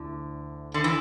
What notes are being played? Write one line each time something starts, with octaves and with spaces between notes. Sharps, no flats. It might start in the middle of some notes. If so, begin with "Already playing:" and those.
Already playing: D2 D3 E4
D3
E3